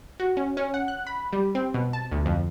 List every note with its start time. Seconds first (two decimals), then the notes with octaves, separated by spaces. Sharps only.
0.20 F#4
0.37 C#4
0.57 C#4
0.74 F#5
0.88 F#6
1.07 B5
1.33 G3
1.55 C4
1.74 B2
1.93 A5
2.12 D2
2.26 F2